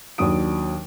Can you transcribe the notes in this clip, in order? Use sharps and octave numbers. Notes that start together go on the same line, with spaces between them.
D#2 F#3 D4 D#6 D7